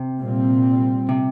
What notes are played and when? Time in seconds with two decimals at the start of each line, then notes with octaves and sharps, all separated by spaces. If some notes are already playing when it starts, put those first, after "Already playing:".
Already playing: C3
0.19 A#2 G3 C4
1.09 C3